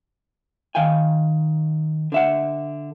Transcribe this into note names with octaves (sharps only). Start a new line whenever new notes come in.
D#3 F5 G5 G#5
D3 E5 F#5